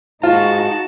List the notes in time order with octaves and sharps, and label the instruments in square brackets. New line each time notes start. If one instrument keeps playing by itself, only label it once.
[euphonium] G#2 [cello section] D#4 F#4 [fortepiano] F4 [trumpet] A5